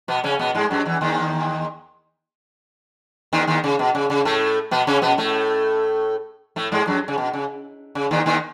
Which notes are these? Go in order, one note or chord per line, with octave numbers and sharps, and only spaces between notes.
B2 B3
C#3 C#4
B2 B3
G#2 G#3
F#2 F#3
E2 E3
D#2 D#3
D#2 D#3
D#2 D#3
C#3
B2
C#3
C#3
A2 A3
B2 B3
C#3 C#4
B2 B3
A2 A3
A2 A3
G#2 G#3
F#2 F#3
C#3
B2
C#3
C#3
D#2 D#3
D#2 D#3